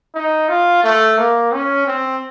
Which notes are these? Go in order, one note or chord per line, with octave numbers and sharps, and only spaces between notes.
D#4
F4
A3
A#3
C#4
C4